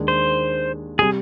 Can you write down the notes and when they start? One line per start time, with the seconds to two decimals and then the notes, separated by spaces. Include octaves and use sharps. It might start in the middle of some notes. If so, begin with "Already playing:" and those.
Already playing: D#2 D#3 G#3 D4
0.08 C5
0.99 C3 G3 G#4